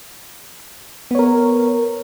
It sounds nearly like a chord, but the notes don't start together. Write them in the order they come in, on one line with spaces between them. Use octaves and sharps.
B3 C#5 A#4